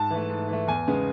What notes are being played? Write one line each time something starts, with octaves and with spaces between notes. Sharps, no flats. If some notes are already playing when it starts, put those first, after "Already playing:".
Already playing: G#2 A5
E3 A3
G#2
E3 A3
E2 G#5
C#3 G#3 B3